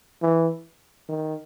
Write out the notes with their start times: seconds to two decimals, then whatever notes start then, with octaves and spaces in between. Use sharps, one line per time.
0.22 E3
1.09 D#3